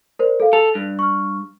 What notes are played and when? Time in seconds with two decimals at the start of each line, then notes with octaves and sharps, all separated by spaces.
0.19 A#4 C5 D5
0.40 A4 F5
0.53 A4 F7
0.75 G2
0.99 C#6 F6